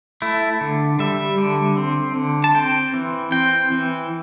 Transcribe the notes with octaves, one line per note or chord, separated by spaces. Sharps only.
A3 E4
D3
G3 E5
D3
C4
D3
A5
C4 G5
E3
C4 G5
E3